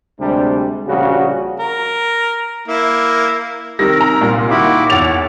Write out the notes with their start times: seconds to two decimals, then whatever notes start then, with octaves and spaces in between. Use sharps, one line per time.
0.20 D2 C3 G3 G#3 D4
0.88 A#1 C#3 G3 F#4
1.60 A#4
2.68 A#3 E4
3.79 C3 D#3 G3 A#4 E6 A#6
4.01 A#5
4.21 C2 A#2
4.50 D#3 E4 F#4 B5 D6
4.90 E2 E4 C#5 A6 F7